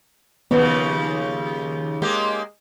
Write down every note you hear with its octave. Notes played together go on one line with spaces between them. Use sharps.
D#2 C#3 F3 B3
G#3 A#3 G4